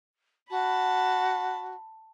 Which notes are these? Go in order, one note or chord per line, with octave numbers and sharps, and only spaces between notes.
F#4 A5 B5